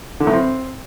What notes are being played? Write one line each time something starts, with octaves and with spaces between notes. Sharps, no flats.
D3
A2
C4